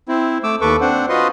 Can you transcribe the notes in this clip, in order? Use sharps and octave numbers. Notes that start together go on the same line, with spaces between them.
C4 E4
A3 D6 E6
D#2 A4 B4 C#6 D6
C4 D4 C5 F#5
F4 F#4 B4 D#5 C6